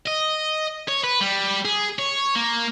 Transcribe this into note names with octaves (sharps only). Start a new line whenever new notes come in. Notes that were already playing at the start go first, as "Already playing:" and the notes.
D#5
C#5
B4
G3
G#4
C#5
A#3